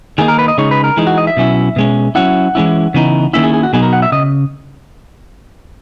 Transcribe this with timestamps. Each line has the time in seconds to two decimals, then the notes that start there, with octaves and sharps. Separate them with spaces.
0.18 D#3 A#3 D#4 G#4
0.28 A#4
0.39 B4
0.48 D#5
0.58 C#3 G#3 D#4 C#5
0.71 B4
0.84 A#4
0.97 E3 G#3 D#4
1.07 F#4
1.18 D#5
1.27 E5
1.37 B2 F#3 C#4 E4
1.76 B2 G#3 C#4
2.15 F#3 C#4 E4 F#5
2.55 E3 G#3 C#4 E4
2.94 C#3 E3 B3 D#4
3.33 D#3 A#3 C#4 E4 E5
3.43 G#4
3.53 G#4
3.63 F#4
3.73 B2 F#3 B3 D#4 G#4
3.83 A#4
3.93 F#5
4.02 E5
4.12 C#3 D#5